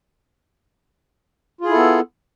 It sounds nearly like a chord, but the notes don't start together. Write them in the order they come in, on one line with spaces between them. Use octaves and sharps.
F4 G#4 E4 A4 B3